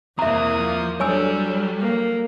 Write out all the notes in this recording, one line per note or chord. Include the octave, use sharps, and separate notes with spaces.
E2 A#3 C4 E4 E5 A#5 D#6
F3
F#3 G3 D4 A4 C#5 G#5 E6
A#3